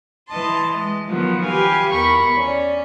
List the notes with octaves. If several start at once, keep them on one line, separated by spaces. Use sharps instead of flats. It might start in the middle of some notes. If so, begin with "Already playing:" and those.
E3 D#5 A5 C6
G#3 D#5
D#3 F3 F#3 B3 F4 F#4
G4 B4 F5 G#5
E2 A#4 B5 C#6
C#4 D5